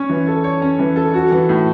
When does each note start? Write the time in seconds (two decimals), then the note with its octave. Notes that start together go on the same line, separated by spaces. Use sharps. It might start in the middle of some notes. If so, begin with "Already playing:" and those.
Already playing: C#4 C#5
0.09 E3
0.27 A4
0.44 C#5
0.62 C#4
0.79 E3
0.96 A4
1.14 F#4
1.31 E3
1.49 A2